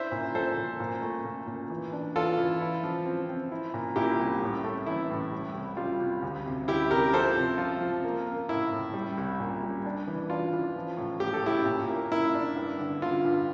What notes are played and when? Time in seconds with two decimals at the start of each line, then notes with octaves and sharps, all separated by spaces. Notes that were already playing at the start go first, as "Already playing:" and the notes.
Already playing: D4 E4 C5 E5
0.12 A#2
0.35 F3 A4 C5
0.57 A#2
0.80 A#2
1.02 A3
1.25 A#2
1.47 A#2
1.70 E3
1.92 D4
2.16 E3 F4 A4
2.38 E3
2.61 E4
2.83 F3
3.05 C4
3.29 C4
3.52 E4
3.74 A#2
3.96 A#2 E4 G4
4.19 C2
4.42 A2
4.64 A3
4.86 E3 E4
5.10 A2
5.32 G3
5.55 C2
5.77 G3 F4
6.00 C2
6.22 D2
6.46 C3
6.68 D2 E4 G4
6.91 C3 G4 A#4
7.13 F3 A4 C5
7.36 C3
7.58 F3 F4
7.81 F3
8.04 A#3
8.27 A#3
8.49 A2 E4
8.72 A2
8.94 G3
9.17 C2
9.40 A#2
9.62 G3
9.85 D4
10.07 E3
10.30 D4 F4
10.53 E3
10.76 F3
10.97 A2
11.20 A2 G4
11.34 A4
11.43 A2 E4 G4
11.66 A#2
11.88 A#3
12.12 A#3 E4
12.34 D4
12.56 G2
12.79 D3
13.02 D3 F4
13.25 G2